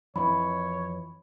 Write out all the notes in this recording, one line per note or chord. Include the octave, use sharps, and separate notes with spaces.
F2 E3 C#5 B5